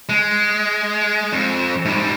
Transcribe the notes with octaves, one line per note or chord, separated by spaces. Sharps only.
G#3
F2
G#2 G3